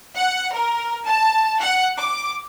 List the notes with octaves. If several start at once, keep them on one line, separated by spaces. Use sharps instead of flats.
F#5
A#4
A5
F#5
D6